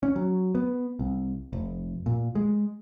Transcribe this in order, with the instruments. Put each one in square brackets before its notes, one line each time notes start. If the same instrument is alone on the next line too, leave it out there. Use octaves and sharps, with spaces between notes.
[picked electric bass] C#4
F#3
B3
C2
F1
A#2
G#3